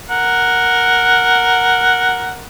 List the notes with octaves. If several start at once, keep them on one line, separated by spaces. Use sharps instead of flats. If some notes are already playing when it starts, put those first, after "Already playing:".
A#4 F#5